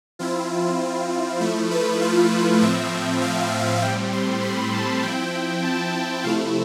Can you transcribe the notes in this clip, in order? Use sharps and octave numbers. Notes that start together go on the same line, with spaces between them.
F3 C4 E4 F4
F3 A3 E4
B4
F4
A2 F3 C4 E5
F5
A2 G3 C4 G5
C6
B5
A5
F3 C4 E4 G5
A5
C3 F3 A3 E4 F5